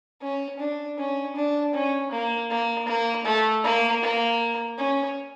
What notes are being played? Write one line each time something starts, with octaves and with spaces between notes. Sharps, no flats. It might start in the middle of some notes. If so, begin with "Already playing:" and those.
C#4
D4
C#4
D4
C#4
A#3
A#3
A#3
A3
A#3
A#3
C#4